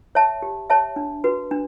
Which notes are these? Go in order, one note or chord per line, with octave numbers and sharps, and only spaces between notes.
C#5 E5 A5
G4
C#5 E5 A5
D4
F#4 B4
D4